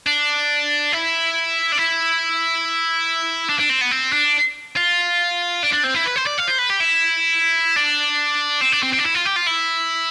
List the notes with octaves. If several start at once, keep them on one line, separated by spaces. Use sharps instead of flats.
D4
E4
D4
E4
D4
D4
C4
B3
C4
D4
F4
D4
D4
C4
E4
B4
C5
D5
F5
C5
B4
G4
E4
D4
C4
D4
C4
C4
D4
E4
F4
G4
F4
E4